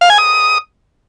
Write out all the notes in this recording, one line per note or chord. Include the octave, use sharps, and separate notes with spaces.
F5
G#5
D#6